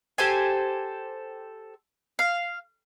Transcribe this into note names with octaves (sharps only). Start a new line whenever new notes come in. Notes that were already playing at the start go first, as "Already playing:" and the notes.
G4 A4 C5 G#5
F5